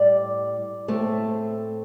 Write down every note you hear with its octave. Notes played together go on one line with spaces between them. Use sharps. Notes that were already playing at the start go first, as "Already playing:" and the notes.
Already playing: A2 G3 D5
A2 A3 C4